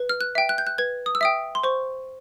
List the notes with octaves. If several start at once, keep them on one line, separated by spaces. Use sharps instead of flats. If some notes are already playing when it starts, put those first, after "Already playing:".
Already playing: B4
F6
F#6
E5 G5
F#6
G6
F#6
B4 G#6
D#6
E6
E5 G5 D#6
C6
C5 C#6